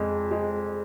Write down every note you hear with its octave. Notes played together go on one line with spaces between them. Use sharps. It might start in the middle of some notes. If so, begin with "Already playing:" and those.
Already playing: F2 G#3
G#3